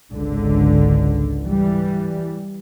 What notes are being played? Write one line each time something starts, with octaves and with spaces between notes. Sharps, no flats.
G#1 C#2 D3
E3 G3